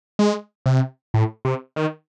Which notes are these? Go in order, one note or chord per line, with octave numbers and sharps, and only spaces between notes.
G#3
C3
A2
C3
D#3